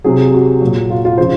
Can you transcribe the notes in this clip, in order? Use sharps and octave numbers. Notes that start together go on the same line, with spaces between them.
C3 F#3 G#4
F#4
A#2 F#3
F4
F4
C#3 F3 C5